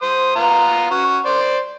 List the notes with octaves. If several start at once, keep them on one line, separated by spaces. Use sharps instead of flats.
C5 D#6
B3 F4 A#5
C#4 F#4
C5 D5